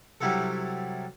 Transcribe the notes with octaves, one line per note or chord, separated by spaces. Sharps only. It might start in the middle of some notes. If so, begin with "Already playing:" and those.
C3 F#3 G3 E4 F#4 A4